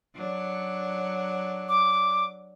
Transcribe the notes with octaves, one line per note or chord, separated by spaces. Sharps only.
F#3 D4
D6